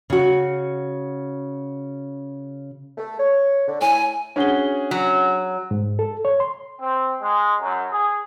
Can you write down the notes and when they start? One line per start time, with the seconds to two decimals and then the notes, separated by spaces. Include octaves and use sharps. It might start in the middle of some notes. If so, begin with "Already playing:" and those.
0.10 C#3 F#4
2.98 A3
3.19 C#5
3.67 D3
3.81 A2 G#5
4.36 C#4 D4 F#4 G#4 G7
4.91 F#3
5.71 G#2
5.99 A4
6.25 C#5
6.40 C6
6.80 C4
7.21 G#3
7.60 F#2 F#3
7.90 G#4